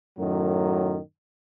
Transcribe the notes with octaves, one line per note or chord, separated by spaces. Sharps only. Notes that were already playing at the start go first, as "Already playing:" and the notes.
F#2 A2 D#3 F#3